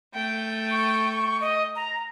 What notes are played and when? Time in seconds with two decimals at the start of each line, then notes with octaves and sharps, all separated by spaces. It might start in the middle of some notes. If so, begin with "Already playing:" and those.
0.14 A3 G5
0.71 C#6
1.41 D#5
1.76 A#5